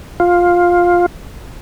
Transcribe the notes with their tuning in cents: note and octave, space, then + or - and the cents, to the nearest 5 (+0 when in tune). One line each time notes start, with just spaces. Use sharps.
F4 +10